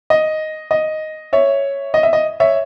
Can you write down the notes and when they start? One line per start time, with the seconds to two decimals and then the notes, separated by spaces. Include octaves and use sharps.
0.10 D#5
0.71 D#5
1.33 C#5 E5
1.94 D#5
2.03 E5
2.13 D#5
2.40 C#5 E5